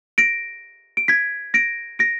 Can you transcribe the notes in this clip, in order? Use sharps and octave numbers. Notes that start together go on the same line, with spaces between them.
A#6 D7
D7
G#6 B6
A#6 D7
A#6 D7